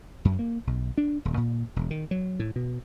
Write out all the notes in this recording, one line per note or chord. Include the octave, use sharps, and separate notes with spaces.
F#2
A#3
B1
D4
D#1
A#2
E1
D#3
F#3
A2
B2